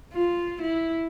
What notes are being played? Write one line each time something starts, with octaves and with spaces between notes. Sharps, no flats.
F4
E4